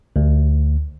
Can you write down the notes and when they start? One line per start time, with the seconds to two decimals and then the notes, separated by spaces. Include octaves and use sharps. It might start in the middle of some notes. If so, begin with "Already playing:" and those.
0.16 D2